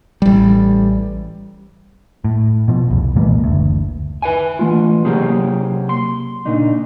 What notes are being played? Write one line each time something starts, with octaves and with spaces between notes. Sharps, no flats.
A1 G3
A2
B2 F3
C2 F2
A#2 E3 G#3 A#3
F#1 D2
B4 E5 G#5
E3 A3 F4
C3 F#3 A#3 C#4 G4 G#4
C6
A#2 C#3 D4 D#4